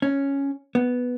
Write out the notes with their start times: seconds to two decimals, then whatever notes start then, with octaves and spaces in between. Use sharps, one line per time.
0.02 C#4
0.75 B3